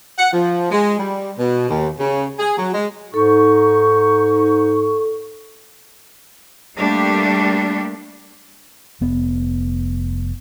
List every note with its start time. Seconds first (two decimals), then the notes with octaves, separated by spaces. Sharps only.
0.18 F#5
0.33 F3
0.71 G#3
0.99 G3
1.38 B2
1.69 D#2
1.99 C#3
2.39 G#4
2.58 F#3
2.73 G#3
3.14 G#2 D#4 A4 C#6
6.79 G3 A3 A#3 D4 G4
9.01 F1 B3